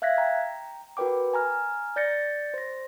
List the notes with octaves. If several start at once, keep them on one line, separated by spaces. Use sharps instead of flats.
E5 F5 F#6 G#6 A#6 B6
G5 A#5
F#4 A#4 B4 G5 D6
G#5 A#5 F6
D5 G6 A6 A#6 C#7
C5 A#6